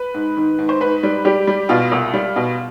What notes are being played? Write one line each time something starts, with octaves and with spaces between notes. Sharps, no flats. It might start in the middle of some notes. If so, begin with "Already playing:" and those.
Already playing: B4
G#2
D#3
G#2
C5
G#2 B4
G3
G3 G4
G3
B2 F4
C2
G3
B2